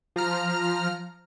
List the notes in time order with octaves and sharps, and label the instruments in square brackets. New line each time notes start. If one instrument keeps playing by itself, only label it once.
[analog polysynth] F3 A#5 F6